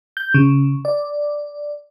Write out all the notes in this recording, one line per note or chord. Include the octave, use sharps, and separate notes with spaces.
G6
C#3
D5